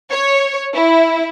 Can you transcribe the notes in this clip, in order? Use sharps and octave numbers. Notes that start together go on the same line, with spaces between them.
C#5
E4